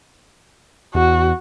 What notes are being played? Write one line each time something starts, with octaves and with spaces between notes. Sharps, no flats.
E2 F#4